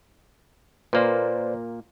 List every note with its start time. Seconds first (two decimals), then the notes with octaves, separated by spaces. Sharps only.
0.93 A#2 A#3 B4 C5 D5